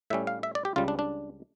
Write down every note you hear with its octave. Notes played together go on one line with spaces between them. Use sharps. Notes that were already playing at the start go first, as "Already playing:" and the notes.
A2 G3 C#4 E5
F5
E5
D5
G4
C#2 C#3 G3 F4
D4
D4